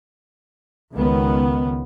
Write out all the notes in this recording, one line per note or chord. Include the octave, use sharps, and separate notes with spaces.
C#2 D#3 B3